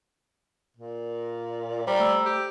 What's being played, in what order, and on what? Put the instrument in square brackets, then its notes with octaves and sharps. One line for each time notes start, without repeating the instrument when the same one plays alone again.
[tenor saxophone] A#2
[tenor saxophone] G3 [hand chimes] C5 A#5
[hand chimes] A3 E6
[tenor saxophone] G4